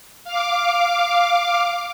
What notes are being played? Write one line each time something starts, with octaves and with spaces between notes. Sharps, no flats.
F5 D6